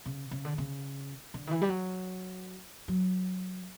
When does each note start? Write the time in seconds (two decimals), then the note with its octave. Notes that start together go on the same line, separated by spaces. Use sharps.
0.05 C#3
0.31 C#3
0.45 D3
0.58 C#3
1.34 D3
1.47 D#3
1.51 E3
1.62 G3
1.69 F#3
2.88 F#3